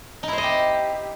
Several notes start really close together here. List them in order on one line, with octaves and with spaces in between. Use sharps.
D#4 E4 C5 D#5 G4